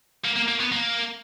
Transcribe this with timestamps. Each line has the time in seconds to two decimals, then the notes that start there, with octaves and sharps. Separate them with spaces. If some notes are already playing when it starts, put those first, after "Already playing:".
0.25 A#3
0.36 A#3
0.48 A#3
0.60 B3
0.72 A#3